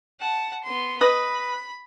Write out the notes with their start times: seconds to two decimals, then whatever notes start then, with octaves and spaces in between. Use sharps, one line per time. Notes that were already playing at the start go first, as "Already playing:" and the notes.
0.20 F#5 A5
0.64 B3 C6
1.01 B4 D#5 B5 D#6